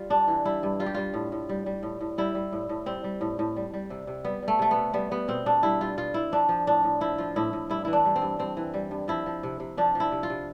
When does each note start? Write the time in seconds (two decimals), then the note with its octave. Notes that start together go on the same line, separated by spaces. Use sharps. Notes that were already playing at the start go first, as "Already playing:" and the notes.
Already playing: G3 F4
0.10 G2 D4
0.28 E3
0.45 G3 E4
0.63 G2
0.80 G3 F4
0.86 G4
0.94 G3 F4
1.14 A2
1.32 A2
1.49 G3
1.66 G3
1.83 A2
2.01 A2
2.18 G3 E4
2.35 G3
2.52 A2
2.69 A2
2.86 G3 C4
3.04 G3
3.21 A2
3.39 A2
3.56 G3
3.74 G3
3.90 C3
4.07 C3
4.25 G3 B3
4.42 G3
4.48 A3
4.59 C3 A3
4.71 B3
4.76 C3
4.93 G3 B3
5.11 G3 B3
5.28 B2 C4
5.46 B2 D4
5.63 G3 E4
5.81 G3 F4
5.98 B2 F4
6.14 B2 E4
6.32 F3 D4
6.49 F3
6.67 A2 D4
6.84 A2
7.01 F3 E4
7.18 F3 F4
7.36 A2 E4
7.53 A2
7.70 G2 E4
7.85 E3 E4
7.93 D4
8.05 G3
8.16 C4
8.22 G2
8.39 G2 C4
8.57 E3
8.74 G3
8.91 G2
9.08 F3 E4
9.26 F3
9.43 C3
9.60 C3
9.77 F3 D4
9.95 F3
10.00 E4
10.11 C3
10.23 F4
10.30 C3